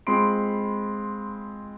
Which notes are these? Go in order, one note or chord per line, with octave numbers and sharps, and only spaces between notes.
G#3 C4 F4 B5 C6 D7